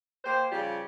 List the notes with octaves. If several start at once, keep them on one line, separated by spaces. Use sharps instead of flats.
A#3 G4 C5
C#3 F3 G3 F4 G4